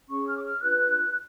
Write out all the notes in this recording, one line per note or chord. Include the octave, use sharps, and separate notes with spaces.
C#4 G#4 C#5 C#6
F6
D6
F6
D4 F4 B4 F#6